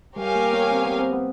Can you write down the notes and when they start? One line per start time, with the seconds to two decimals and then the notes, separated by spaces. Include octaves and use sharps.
0.16 G3 G4 A#4 C#5 F5 G#5
0.35 A#3
0.53 B3
0.71 C4
0.85 B3
0.99 C4
1.12 B3